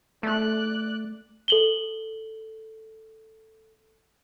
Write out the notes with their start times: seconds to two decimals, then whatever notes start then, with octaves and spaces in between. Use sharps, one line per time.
0.23 A3 D5 F#6
1.48 A4 F#7 G7